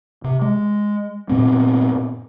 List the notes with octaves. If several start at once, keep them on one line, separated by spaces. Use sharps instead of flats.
C3
G#3
F#2 A#2 B3 C4